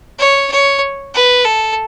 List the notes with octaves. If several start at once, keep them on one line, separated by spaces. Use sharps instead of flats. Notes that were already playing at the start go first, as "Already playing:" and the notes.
C#5
C#5
B4
A4